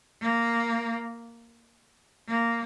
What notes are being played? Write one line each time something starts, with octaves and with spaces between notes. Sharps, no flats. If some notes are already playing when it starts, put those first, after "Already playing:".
A#3
A#3